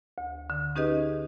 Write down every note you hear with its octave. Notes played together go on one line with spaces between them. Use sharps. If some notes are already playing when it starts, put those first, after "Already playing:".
D2
D3
C#4 D#4 G4 G#4 B4 D#5